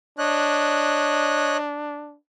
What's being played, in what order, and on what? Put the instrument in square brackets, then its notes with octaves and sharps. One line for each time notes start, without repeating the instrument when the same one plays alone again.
[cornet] D4 [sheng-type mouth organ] C#5 D#5 F#6